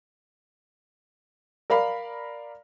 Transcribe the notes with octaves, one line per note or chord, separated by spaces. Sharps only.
A#4 D5 F5 B5